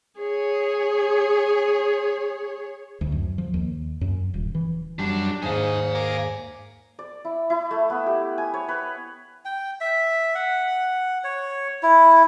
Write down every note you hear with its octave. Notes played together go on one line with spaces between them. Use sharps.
G#4 C#5
D2
F#2
F3
D#2
F#2
D#1
E3
F#2 G3 D4
D#2 G#2 D#4 F5 G#5
G#4 A#4 D6
D5
E4
E4
A3
B3
G4
G#5
C#5
B4
G5
E5
F#5
C#5
E4